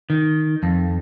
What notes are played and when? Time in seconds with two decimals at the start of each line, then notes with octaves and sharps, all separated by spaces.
0.10 D#3
0.63 F2